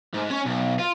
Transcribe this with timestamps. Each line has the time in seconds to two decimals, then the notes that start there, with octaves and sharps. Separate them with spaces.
0.14 G#2
0.30 C#4 C#5
0.45 B1
0.79 F4